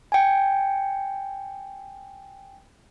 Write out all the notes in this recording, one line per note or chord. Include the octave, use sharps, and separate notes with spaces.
G5 G#5